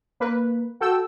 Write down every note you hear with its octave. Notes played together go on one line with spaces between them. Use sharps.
A#3 B4
F#4 A4 G5 E6